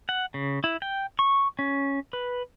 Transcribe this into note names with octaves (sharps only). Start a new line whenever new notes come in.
F#5
C#3
E4
G5
C#6
C#4
B4